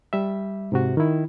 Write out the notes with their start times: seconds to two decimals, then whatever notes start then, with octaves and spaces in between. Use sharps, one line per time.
0.13 G3 E5
0.72 G#2 C3 F#4
0.97 D#3 E4